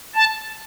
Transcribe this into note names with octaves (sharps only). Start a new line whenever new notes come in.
A5